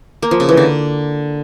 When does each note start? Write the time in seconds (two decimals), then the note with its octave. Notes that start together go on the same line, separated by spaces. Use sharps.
0.22 A#3
0.31 F3
0.40 C#3
0.49 E3
0.57 D3